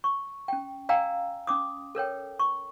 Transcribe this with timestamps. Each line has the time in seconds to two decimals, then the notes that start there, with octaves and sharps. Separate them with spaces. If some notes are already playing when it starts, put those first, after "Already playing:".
0.04 C#6
0.48 C#4 G5
0.89 D5 F5 G5 G#5 A#5 E6
1.47 C#4 D6 D#6
1.95 A4 A#4 C#5 G5
2.39 C#6